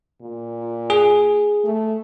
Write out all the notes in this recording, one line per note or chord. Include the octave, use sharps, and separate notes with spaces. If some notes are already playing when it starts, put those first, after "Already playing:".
A#2
G#4
A3